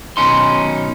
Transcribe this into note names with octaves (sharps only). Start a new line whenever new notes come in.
B1 B2 D#3 C#4 D#4 C6